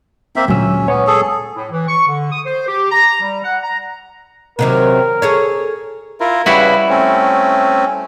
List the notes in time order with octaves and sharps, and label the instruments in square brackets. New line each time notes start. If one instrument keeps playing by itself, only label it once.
[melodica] A#3 C4 E5
[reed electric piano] D2 F#3 E6 [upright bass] A#2 G#3 [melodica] C#4
[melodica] B3 [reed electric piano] C#5 G#5 C#6
[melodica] G#4 A4
[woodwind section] A2
E3
C#6
D3
D#6
C5
G4
A#5
G3
F#5
A#5
[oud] C3 D#3 F#3 [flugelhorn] A#4
[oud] G#4 A4 C#5
[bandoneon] E4 F4 A#4
[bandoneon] C#3 B4 [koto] G3 E4 F#4
[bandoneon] A3 C4 C#4